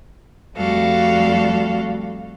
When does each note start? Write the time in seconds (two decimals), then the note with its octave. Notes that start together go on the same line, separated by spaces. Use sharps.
0.56 F2 G3 A3 F#4 A4 F5